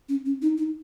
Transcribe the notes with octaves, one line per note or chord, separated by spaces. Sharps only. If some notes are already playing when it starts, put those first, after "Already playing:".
C#4
C#4
D#4
D#4